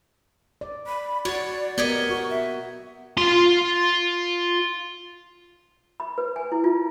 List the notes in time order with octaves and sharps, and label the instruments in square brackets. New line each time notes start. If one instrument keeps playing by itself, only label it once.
[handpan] D5
[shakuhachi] B5
[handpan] F#4 [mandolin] C#5 [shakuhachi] D5
[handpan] B3 A#4 [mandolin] G4 C#5 D#5
[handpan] F#4 [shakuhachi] C#6
[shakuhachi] E5
[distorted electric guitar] F4 C6
[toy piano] B5
B4
G#5
E4
F4